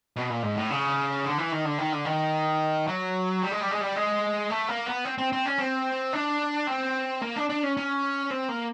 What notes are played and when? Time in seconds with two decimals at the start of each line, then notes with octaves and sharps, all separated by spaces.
0.16 B2
0.30 A#2
0.42 G#2
0.56 A2
0.70 C#3
1.24 D3
1.38 E3
1.52 D#3
1.65 D3
1.78 D#3
1.92 D3
2.05 D#3
2.87 F#3
3.42 G3
3.51 G#3
3.60 G3
3.71 G#3
3.81 G3
3.96 G#3
4.50 A3
4.69 A#3
4.87 B3
5.05 C4
5.18 C4
5.32 C4
5.46 C#4
5.59 C4
6.13 D4
6.67 C4
7.22 A#3
7.36 D4
7.49 D4
7.63 C#4
7.77 C#4
8.30 C4
8.49 A#3